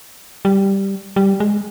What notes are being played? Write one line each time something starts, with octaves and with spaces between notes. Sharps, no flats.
G3
G3
G#3